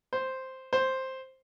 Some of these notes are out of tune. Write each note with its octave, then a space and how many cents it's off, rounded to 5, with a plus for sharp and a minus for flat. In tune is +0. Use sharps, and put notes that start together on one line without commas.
C5 +0
C5 +5